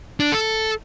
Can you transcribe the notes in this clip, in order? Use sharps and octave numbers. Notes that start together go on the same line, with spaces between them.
D4
A4